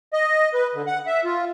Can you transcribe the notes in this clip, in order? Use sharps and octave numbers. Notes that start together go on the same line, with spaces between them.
D#5
B4
D3
F#5
E5
F4